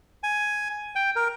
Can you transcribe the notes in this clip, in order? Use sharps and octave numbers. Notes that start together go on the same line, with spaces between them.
G#5
G5
A#4